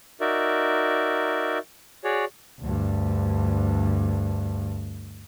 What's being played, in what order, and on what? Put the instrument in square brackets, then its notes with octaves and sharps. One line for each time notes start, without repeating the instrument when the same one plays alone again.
[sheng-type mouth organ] D#4 F#4 A#4 D5 E5
F#4 G#4 C#5 D5
[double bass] D2 G2